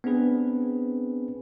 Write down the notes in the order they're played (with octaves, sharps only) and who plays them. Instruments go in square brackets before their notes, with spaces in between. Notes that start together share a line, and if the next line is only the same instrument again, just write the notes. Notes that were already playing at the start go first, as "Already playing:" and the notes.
[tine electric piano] B3 C4 D4 G#4 B4